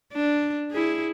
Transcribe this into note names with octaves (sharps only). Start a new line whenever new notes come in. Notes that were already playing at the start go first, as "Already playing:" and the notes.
D4
E4 G#4